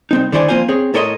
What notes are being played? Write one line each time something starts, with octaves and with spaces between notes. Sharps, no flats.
C2 C4 D#4
D3 D#3 E4 C5 D5 G#5
F3 A#3 C4 F4 C5 G#5
C4 G#4 C#5
A2 A4 A#4 C#5 D#5 C6